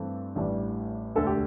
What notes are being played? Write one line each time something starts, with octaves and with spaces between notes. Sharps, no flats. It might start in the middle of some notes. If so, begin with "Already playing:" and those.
Already playing: G2 E3 A3 C4
A1 A2 E3 G3 D4
E1 D2 D3 A4
G4